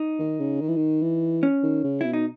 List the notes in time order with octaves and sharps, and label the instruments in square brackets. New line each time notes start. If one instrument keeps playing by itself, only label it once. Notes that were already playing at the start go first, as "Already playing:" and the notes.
Already playing: [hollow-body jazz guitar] D#4
[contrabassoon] D#3
C#3
D#3
E3
D#3
E3
[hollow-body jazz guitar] C#4
[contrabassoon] D#3
C#3
[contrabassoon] B2 [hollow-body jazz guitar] E4
[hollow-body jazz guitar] D#4